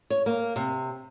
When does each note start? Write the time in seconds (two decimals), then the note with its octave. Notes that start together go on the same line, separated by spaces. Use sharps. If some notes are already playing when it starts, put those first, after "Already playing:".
0.10 C#5
0.26 A#3
0.56 C3